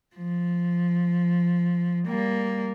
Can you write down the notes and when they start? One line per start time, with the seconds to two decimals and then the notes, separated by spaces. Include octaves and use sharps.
0.16 F3
2.08 G3 A#3